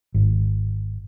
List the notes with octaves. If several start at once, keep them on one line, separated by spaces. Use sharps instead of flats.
G#1